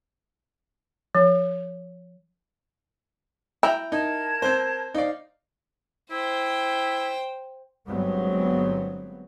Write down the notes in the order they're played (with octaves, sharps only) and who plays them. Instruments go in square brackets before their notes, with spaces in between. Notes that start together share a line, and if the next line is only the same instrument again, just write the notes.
[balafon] F3
[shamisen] E4 [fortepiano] G5 A#5
[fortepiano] D#4 [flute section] A#4 A5 G#6
[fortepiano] C4 C5
[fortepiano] D#4 D5 [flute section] C5 F5
[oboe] E4 [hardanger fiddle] C5 G5
[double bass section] G1 G2 F#3 G#3 B3 C4